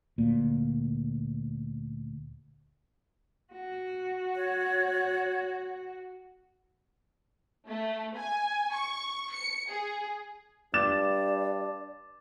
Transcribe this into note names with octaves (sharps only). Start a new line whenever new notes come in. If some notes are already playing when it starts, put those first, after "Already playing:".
D2 A#2
F#4
C#5
A3
G#5
C#6
C#7
G#4
G2 D5 D6 A6 E7